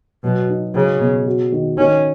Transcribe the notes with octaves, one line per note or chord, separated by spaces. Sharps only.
B2 F#3
D#4
C#3 F#3
B2
F#4
D#3
D#3 C#4